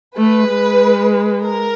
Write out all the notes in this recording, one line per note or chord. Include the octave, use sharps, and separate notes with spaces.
A3 B4
G#3
A#4